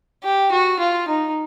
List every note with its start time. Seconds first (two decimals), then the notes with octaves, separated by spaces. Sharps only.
0.24 G4
0.52 F#4
0.79 F4
1.08 D#4